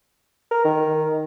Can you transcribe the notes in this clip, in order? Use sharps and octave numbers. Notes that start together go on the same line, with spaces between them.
A#4
D#3